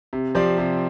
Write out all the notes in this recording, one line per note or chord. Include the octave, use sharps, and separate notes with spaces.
C3
F3 C4 G4 D5
C3